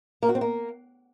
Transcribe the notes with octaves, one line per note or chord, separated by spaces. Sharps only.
A#3
F#4
C4
A#3